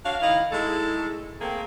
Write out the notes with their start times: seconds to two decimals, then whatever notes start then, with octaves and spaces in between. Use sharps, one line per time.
0.05 D4 F#4 C#5 F5
0.20 D#3 E4 D#5 F5
0.52 G#3 A3 D#4 E4 G#4 A4
1.40 A3 A#3 C4 G#4